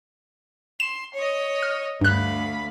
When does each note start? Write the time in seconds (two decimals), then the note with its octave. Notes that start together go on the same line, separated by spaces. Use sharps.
0.80 C6 E7
1.14 C#5 D#5
1.63 F6
2.01 D2 G2 F5 B5 F#6